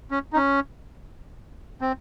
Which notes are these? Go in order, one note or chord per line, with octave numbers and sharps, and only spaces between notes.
C#4
D#4
C#4
C4